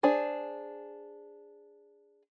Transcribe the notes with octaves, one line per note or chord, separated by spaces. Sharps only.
D4 G#4 C5